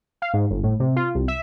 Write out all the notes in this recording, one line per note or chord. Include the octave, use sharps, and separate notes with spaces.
F5
G#2
G1
A2
C3
F4
C2
E5